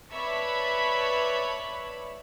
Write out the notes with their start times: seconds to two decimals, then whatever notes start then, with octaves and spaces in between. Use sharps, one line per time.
0.12 B4 C#5 D5 E5 A5 B5